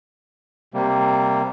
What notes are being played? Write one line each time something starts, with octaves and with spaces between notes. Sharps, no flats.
C3 G3 A#3